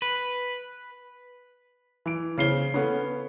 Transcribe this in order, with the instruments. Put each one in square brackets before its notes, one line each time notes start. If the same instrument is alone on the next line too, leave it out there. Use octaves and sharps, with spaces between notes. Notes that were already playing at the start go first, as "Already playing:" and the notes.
[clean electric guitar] B4
[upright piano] E3 D7
[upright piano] C#3 C7 G7 [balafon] B3 E4 C5
[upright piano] B3 C#4 [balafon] A4 F#5 B5